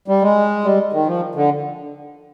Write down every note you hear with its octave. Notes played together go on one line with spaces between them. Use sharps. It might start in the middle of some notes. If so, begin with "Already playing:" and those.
G3
G#3
G3
D#3
F3
D3